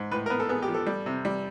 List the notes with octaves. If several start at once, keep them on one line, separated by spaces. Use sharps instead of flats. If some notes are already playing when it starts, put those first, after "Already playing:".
Already playing: G#2
A2 B4
A#4
B3 B4
A4
B3 G#4
G4
F3
A4
G3
C3
G3